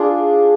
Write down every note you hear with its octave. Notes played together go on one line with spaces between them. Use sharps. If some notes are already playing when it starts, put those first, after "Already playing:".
Already playing: D4 F4 G#4